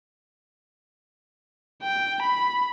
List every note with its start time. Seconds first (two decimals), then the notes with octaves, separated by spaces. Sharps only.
1.82 G5
2.23 B5